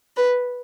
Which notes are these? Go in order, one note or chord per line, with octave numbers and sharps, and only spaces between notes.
B4